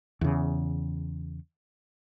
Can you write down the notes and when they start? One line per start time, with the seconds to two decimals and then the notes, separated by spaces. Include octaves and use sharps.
0.21 E2 C#3